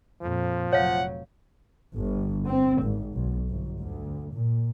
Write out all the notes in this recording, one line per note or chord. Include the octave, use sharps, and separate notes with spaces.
F2 A#2 F3
F1 F#3 C#5 F5 F#5
G1
C4
G#1
B1
G1
D2
A#2